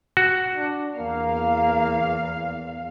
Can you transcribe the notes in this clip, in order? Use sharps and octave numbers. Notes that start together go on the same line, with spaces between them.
F#4
D4
E2 A#3 F5